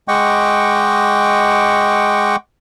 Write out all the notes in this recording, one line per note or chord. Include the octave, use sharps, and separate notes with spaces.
G#3 D#5 F#5 G5 C#6 D6